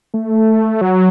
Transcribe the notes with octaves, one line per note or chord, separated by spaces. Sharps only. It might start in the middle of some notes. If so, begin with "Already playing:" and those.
A3
F#3